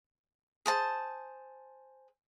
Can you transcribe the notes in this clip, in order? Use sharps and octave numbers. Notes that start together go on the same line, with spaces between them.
G#4 C5 A5